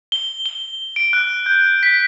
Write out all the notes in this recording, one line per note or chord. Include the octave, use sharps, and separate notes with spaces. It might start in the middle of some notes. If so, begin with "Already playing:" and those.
G7
G7
D7
F#6
G6
B6